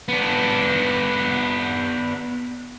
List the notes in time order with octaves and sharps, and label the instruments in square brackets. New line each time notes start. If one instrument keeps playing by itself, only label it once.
[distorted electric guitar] B3 D4